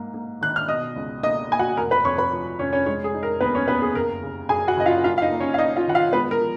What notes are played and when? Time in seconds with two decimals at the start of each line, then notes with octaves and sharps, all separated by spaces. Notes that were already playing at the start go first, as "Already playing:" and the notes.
Already playing: G#2 A#3
0.14 A#3
0.41 D#3 F#6
0.56 F6
0.68 B2 D#5 D#6
0.96 C#2
1.23 A#3 D#5 D#6
1.50 A#3 G#5
1.59 F#4 F#5
1.77 F1 A#4 A#5
1.91 B4 B5
2.05 F2 C#5 C#6
2.18 B4 B5
2.32 F3
2.59 F1 C#4 C#5
2.73 C#4 C#5
2.86 G#3 C#4 C#5
3.04 G#4
3.14 D#4
3.23 A#4
3.41 D#2 B3 B4
3.55 C#4 C#5
3.68 D#2 B3 B4
3.82 G#4
3.95 F#1 A#4
4.22 C#3
4.49 F#2 G#4 G#5
4.68 F#4 F#5
4.77 F#1 D#5
4.86 F4 F5
5.04 F#2 F4 F5
5.18 F5
5.22 D#4 D#5
5.31 A#3
5.40 C#4 C#5
5.54 F5
5.58 D#4 D#5
5.76 F4 F5
5.86 D#3 F#5
5.95 F4 F5
6.13 G#3 B3 B4
6.31 A#4
6.40 F3